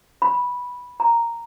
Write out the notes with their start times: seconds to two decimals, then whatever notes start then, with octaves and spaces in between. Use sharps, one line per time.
0.22 B5
1.00 A#5